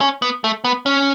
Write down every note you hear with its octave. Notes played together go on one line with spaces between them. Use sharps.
C#4
B3
A3
B3
C#4